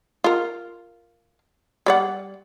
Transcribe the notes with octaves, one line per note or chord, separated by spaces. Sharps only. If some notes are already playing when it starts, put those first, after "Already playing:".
F4 A#4
G3 D5 F#5